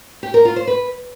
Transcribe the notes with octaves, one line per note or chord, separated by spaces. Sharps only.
G4
A#4
F4
C5
B4